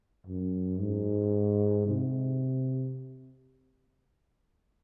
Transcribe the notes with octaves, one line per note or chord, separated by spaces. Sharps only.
F#2
G#2
C3